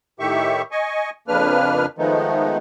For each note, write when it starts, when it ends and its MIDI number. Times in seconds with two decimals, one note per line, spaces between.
0.20 0.62 45
0.20 0.62 51
0.20 0.62 67
0.20 0.62 76
0.20 0.62 85
0.72 1.10 75
0.72 1.10 80
0.72 1.10 85
1.28 1.86 41
1.28 1.86 49
1.28 1.86 58
1.28 1.86 62
1.28 1.86 71
1.28 1.86 89
1.98 2.58 51
1.98 2.58 53
1.98 2.58 56
1.98 2.58 57
1.98 2.58 59
1.98 2.58 63